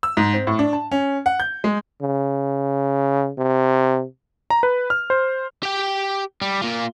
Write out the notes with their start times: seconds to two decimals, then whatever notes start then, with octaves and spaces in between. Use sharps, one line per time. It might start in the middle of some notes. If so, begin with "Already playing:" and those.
0.03 E6
0.17 G#2
0.34 C4
0.47 A2
0.59 D4
0.73 A5
0.92 C#4
1.26 F#5
1.40 G6
1.64 G#3
2.02 C#3
3.38 C3
4.50 A#5
4.63 B4
4.90 F6
5.10 C5
5.63 G4 G5
6.42 G3
6.62 A#3 F4